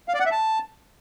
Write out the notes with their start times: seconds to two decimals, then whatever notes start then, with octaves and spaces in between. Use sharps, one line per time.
0.09 F5
0.14 D5
0.20 F#5
0.26 E5
0.31 A5